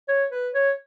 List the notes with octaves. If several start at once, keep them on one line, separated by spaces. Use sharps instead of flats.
C#5
B4
C#5